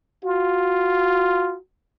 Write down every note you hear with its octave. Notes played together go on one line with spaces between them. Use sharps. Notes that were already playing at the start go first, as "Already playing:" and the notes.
F4 F#4